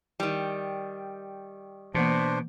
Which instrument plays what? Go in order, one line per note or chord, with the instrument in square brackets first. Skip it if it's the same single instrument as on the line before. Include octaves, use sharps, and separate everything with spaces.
[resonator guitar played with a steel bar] D#3 G3
[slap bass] B2 [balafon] E3 A#3 [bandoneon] D4 C5